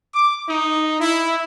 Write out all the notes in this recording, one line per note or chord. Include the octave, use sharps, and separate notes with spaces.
D6
D#4
E4